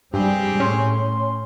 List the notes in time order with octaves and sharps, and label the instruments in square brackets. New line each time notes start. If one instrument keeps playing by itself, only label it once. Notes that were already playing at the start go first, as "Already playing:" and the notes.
[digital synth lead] G2 [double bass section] G3 [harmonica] C4 G4 G#4
[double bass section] A2 [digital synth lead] C#4 [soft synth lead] C6